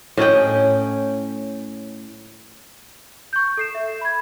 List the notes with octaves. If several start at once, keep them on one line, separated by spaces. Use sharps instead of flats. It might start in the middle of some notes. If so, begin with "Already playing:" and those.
A2 C#4 D#5 G5
C#6 G6
A4 C7 E7
E5
B5 G#6